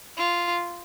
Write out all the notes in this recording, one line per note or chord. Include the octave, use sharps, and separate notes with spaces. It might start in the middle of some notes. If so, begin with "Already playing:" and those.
F4